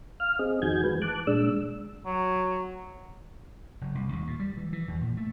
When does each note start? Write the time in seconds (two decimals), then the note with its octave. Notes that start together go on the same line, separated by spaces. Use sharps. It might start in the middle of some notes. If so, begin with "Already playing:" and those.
0.20 F5 F6
0.39 C4 G#4 D#5
0.62 F2 D#3 F#4 G#5 G6 G#6
0.84 E3 G#3 B4
1.02 A5 D6 F#6
1.27 A#2 G#3 D4 E6
2.06 F#3
3.81 F#1
3.95 C2
4.13 D#2
4.27 A#2
4.39 G3
4.57 E3
4.73 E3
4.88 E2
5.01 A#2
5.17 A3